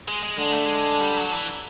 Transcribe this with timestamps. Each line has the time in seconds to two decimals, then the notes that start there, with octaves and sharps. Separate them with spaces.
0.08 G#3
0.23 G#3
0.38 D3 G#3
0.52 A3
0.65 G#3
1.01 G3
1.17 F#3
1.32 E3